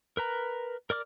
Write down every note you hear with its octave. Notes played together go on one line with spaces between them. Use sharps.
A#4 B4 A#5
A#4 D5 D6 F6